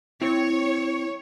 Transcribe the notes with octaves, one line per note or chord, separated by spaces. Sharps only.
C4 E4 C#5